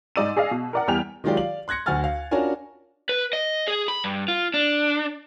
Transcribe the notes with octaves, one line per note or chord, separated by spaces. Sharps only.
G#2 D#4 D5 E6 D#7
G#4 D5 D#5 F5
B2
A#4 D5 F#5
E2 G3 G5 F6 F7
D#3 F#3 G#3 F4 G4 D5
D5 F5 F#7
C6 F#6 G#6 A#6 C#7
D2 F#4 F#5 G#5 F6 A6
F5
C#4 D4 F4 F#4 A#4 G#5
B4
D#5
G#4
B5
G2
F4
D4